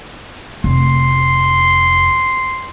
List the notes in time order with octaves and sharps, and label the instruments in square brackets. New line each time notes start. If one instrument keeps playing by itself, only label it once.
[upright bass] F1 [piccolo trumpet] C6